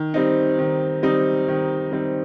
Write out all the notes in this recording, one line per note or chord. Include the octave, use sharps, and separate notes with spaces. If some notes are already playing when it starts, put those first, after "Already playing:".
Already playing: D#3
G3 C4 D#4
D#3
G3 C4 D#4
D#3
G3 C4 D#4